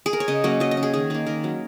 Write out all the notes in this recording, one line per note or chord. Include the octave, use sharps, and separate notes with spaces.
G#4
A#4
C#5
C#3 D#5
F#3 A#3 C#4 D#5
F#3 D#5
D#5
C#4
G#4
D#3 G#4
A#3 D#4 G#4
D#3 A#4
F#3 C#4